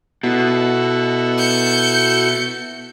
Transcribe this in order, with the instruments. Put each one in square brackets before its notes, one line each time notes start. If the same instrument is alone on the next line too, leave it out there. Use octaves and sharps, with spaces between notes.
[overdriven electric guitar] B2 [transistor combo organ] E4 F#4 A4
[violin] G6 C#7